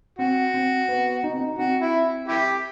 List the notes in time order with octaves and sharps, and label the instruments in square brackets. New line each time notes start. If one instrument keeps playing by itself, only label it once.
[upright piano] C4 [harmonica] F#4
[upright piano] C4
B3
D#4
C4
D#4
[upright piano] C4 [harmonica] F#4
[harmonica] E4
E4 G4